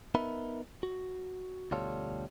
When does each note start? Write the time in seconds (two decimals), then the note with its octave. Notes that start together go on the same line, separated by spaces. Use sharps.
0.15 B3 D#4 A#4 E5 B5
0.83 F#4
1.71 D2 B2 G3 F4 A4 C#5